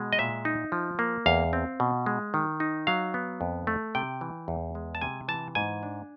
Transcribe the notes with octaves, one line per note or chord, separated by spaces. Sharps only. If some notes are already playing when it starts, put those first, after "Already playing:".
Already playing: B2 G#3
D#5
A#2 E5
D#4
F3
A#3
E2 F5
C4
B2
G#3
D#3
D#4
F#3 F5
B3
F2
A3
C3 G5
E3
E2
G#3
A5
C3 G#5
E3 A5
G#2 G#5
D4